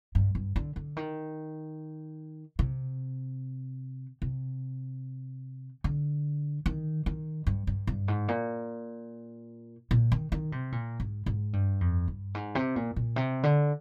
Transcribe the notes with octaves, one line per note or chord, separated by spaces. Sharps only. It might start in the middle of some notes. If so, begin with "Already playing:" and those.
G2
G2
D3
D3
D#3
C3
C3
D3
D#3
D#3
G2
G2
G2
G#2
A#2
A#2
D#3
D#3
C3
A#2
G#2
G#2
G2
F2
G2
G#2
C3
A#2
A#2
C3
D3